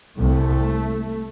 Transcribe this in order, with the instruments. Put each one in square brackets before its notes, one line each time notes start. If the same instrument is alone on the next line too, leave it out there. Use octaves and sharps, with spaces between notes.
[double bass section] C2 C3 A3